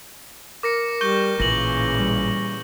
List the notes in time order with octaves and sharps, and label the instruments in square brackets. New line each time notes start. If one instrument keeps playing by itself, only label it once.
[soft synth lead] A#4 [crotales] D6 A#6 C#7
[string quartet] G3 [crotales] C#6 G6 G7
[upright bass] A1 F4 [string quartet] A#2 C#3 E3 [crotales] A#6 F#7
[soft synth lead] G3